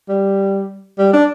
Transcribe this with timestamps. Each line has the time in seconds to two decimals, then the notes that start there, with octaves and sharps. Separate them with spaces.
0.09 G3
0.98 G3
1.13 D4